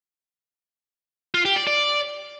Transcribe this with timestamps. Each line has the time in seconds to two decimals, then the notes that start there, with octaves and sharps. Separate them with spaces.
1.34 F4
1.45 G4
1.56 D5
1.67 D5